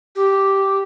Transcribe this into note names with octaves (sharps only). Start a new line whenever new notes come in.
G4